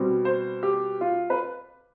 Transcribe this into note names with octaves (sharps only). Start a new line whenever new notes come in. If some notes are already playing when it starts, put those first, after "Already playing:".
Already playing: B2 G3 C4
C5
G4
F4
B4